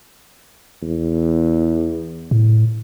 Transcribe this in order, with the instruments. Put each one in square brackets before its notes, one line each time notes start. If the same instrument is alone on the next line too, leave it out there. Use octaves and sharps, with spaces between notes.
[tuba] E2
[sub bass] A2